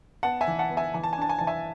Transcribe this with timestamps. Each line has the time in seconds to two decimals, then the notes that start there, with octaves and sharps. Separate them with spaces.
0.23 B3 F#5 A5
0.41 E5 G#5
0.48 E3
0.59 F#5 A5
0.70 B3
0.77 E5 G#5
0.94 E3 G#5
1.04 A5
1.13 G#5
1.18 D4 A5
1.29 G#5
1.39 E3 A5
1.47 E5 G#5